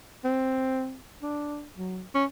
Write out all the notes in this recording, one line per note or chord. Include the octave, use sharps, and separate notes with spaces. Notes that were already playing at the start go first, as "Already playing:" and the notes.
C4
D4
F#3
C#4